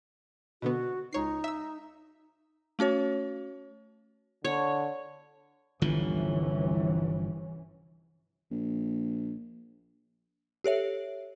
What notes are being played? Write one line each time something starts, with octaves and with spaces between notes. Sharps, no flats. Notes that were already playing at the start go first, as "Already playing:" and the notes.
B2 D3 B3 F#4
C#2 D#4 C#5 C7
E5 E6
A3 C#4 F#4 C#5
D3 C#5
G1 C2 D3 E3 F3 C#4
A#1
G4 A4 C#5 E5